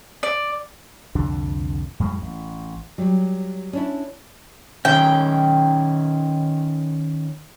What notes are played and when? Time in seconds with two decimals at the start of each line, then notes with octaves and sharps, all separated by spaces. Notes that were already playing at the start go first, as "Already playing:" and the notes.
0.23 D5
1.15 C2 F2 D3 D4
2.00 F2 A2 G3 G#3
2.22 A1
2.98 F#3 G3
3.73 C#4 D4 E4
4.85 D#3 C#4 G5